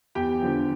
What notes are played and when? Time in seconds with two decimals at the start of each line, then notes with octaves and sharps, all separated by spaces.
0.15 E2 G4 G5
0.42 D3 F3